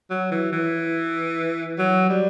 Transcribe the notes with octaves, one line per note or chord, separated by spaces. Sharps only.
F#3
E3
E3
F#3
G3